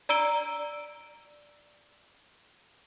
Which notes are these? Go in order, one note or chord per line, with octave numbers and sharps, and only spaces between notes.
D5 A#5 E6 D7 G7